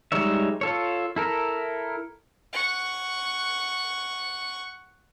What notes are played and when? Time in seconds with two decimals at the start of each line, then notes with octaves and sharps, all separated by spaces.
0.12 G3 G#3 D#4 C#5 E5
0.61 F4 A4 C#5
1.16 E4 A4 A#4
2.53 F#5 C#6